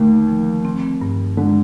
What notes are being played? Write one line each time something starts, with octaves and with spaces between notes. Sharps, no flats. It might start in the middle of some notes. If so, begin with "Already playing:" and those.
Already playing: D#2 D3 A3
F3
C4
G2
D3 G#3